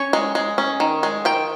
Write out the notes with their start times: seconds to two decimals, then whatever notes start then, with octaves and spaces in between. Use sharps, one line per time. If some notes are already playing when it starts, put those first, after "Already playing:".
Already playing: C#4 C#5
0.13 G#3
0.35 G#3
0.58 C#4
0.80 D#3
1.03 G#3
1.25 D#3 G5